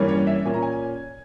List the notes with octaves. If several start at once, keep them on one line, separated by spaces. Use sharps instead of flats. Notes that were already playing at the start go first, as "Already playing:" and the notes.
Already playing: G2 E3 G3 A#3 C#4
C#5
E5
A#2 A#3 C#4 G#5
A#5
G#5